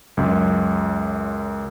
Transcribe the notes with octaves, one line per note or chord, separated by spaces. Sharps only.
C#2 F#2